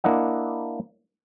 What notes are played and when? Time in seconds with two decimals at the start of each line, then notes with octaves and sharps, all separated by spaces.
0.04 A#3 D4 E4 D#5 F#5